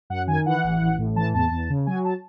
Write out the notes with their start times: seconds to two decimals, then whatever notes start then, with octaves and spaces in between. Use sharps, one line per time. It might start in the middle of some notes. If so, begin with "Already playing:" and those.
0.10 F#2 F#5
0.28 D#3 G#5
0.46 E3 F#5
0.64 A1
0.81 A1
0.98 A2
1.16 E3 A5
1.34 E2 A5
1.51 E2
1.70 C#3
1.86 F#3 G#5
2.05 A5